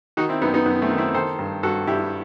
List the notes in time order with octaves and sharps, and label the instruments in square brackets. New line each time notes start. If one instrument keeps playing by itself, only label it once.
[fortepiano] D#3 D#4 F#4
C4 E4
F#2 B3 D#4
B3 D#4
F#2 B3
A3 C4
D#3
C4 E4
D#3 A4 C5
G2
G2 F#4 A4
G2 E4 G4